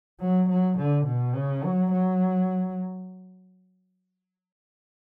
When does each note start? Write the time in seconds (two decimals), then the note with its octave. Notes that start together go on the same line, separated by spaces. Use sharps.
0.21 F#3
0.49 F#3
0.78 D3
1.06 B2
1.35 C#3
1.64 F#3
1.92 F#3